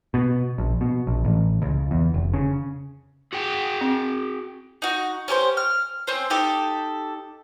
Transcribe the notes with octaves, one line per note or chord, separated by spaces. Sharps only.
B2
A#1
B2
A#1
A1
C#2
E2
F1
C#3
F#4 G#4 G5
C4
D#4 F#4
C#4 G4 A#4 C5
F6
C4 C#4 C5
D#4 G4 A4